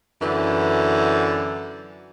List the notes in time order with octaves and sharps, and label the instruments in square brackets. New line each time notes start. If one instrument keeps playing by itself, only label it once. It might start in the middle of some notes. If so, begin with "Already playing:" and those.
[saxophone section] F#2 D3 E3